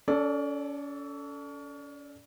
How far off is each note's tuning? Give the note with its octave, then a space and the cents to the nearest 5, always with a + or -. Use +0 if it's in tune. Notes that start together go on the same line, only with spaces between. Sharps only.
C#4 +35 A4 +0 D5 +0